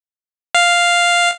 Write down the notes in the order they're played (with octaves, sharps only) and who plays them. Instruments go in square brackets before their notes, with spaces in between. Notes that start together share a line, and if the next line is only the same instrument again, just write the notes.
[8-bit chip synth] F5